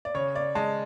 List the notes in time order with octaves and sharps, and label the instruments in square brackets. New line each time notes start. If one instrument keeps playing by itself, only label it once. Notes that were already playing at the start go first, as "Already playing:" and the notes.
[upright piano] D5
C#3 C#5
D5
G#3 A5